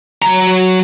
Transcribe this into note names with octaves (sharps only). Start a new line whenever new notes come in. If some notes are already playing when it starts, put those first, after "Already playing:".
F#3 A#5